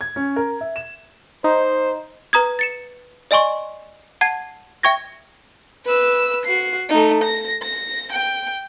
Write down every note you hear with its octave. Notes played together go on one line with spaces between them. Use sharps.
G#6
C#4
A#4
E5
E7
D#4 C5
B4 A#5 D#6 G#6
A6 C#7 E7
D5 D#5 G#5 C6 C#6
F#5 A5 G#6
E5 G5 C#6 G#6 A#6
B4 E6
F#4 C7
A3 D#4
A#6
A#6
G5